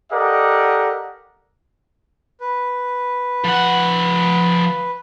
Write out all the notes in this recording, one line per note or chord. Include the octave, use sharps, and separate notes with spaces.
G4 A4 A#4 D5 D#5 F#5
B4
F3 F#5